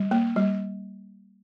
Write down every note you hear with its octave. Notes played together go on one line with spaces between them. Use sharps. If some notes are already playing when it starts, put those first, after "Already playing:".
Already playing: G3
A#3
G3